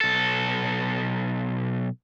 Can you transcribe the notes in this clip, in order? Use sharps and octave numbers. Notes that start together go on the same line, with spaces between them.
B1 A4